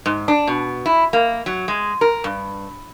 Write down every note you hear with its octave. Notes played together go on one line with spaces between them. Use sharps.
G#2
D4
B2
E4
A#3
F#3
G#3
A#4
G2